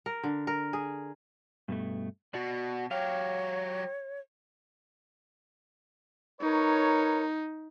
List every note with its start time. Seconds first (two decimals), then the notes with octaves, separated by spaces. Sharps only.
0.06 A#4
0.23 D3
0.47 A#4
0.73 G#4
1.68 G2 B2 A3
2.34 B2 F#4 D5
2.91 F#3 G4 C#5 F5
6.41 D#4 A#4 B4 C#5